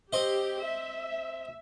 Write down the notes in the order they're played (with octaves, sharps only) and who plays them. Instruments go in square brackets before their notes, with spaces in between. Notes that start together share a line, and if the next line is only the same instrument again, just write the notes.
[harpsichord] C4 D#5 [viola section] G4
[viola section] E5